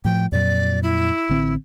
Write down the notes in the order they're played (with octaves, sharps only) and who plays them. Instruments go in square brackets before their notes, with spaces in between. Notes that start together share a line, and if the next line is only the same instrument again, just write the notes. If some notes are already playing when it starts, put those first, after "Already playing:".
[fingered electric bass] A2 F3 [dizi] G5
[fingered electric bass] F2 A#2 F#3 [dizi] D5
[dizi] E4
[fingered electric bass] A1 D3 C4